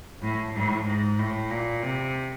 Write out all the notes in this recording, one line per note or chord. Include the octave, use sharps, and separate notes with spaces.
A2
A2
G#2
A2
A#2
C3